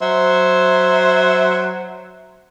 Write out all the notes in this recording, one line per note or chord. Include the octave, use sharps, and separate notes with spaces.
F#3 C5 E5